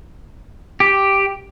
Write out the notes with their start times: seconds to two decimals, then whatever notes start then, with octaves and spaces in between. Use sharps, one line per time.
0.80 G4